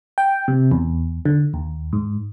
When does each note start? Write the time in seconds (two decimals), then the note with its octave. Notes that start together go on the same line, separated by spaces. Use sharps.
0.18 G5
0.48 C3
0.72 E2
1.26 D3
1.54 D#2
1.93 G#2